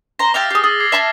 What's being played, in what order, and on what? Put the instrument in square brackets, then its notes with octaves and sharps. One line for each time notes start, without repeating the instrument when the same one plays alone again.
[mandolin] C5 A#5 [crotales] A#6 G7
[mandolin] G4 E5 F5 [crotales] D6 F6 A6
[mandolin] G4 G#4 [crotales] C7
[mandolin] G#4 [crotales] E6 A6 F#7
[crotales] D6 G#6 C7
[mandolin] E5 A5 F6